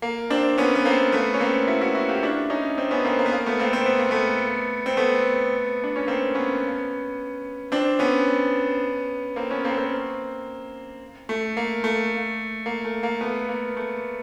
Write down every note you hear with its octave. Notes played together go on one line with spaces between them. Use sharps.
A#3
C4 D4
B3 C#4
B3
A#3 C4
A3 B3
C#4
A#3 C4
E4 F#4
E4 F#4
E4 F#4
F4 G4
D4 E4
C#4 D#4
C4 D4
B3 C#4
A#3 C4
A#3
B3
A#3
A3 B3
A#3 C4
C4
B3
A#3
A3 B3
C4
A3 B3
D4
C#4
A#3 C4
B3 C#4
C4 D4
B3 C#4
A#3 C4
B3 C#4
A#3 C4
A#3 C4
A3
A#3
A3
A#3
A3
A#3
A3 B3
A#3
A3